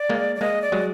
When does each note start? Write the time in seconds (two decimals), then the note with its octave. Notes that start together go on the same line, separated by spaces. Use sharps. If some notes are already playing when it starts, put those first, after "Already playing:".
Already playing: D5
0.09 G#3 A#3
0.36 D5
0.41 G#3 A#3 D#5
0.62 D5
0.72 F#3 G#3